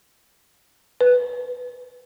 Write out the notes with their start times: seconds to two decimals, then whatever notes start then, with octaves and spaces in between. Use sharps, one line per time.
1.01 B4